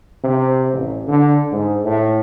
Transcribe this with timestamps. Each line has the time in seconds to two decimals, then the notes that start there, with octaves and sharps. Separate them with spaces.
0.24 C3
0.73 A1
1.07 D3
1.52 G#2
1.85 A2